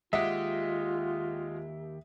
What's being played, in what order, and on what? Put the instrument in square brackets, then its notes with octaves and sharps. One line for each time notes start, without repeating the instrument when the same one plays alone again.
[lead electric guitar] D#2 G4 [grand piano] G#3 D#5 F#5 [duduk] F4 [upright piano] E5